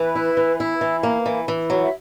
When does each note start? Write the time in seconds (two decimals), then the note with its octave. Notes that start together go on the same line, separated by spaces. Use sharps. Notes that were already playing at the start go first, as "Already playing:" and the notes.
Already playing: E3 B4
0.15 E4
0.37 E3
0.60 E4
0.81 E3
1.03 A#3
1.26 E3
1.48 E3
1.70 F#3
1.83 E5